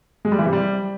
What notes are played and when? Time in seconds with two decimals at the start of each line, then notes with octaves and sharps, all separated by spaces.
0.25 G#3
0.32 G3
0.39 E3
0.46 C3
0.53 G3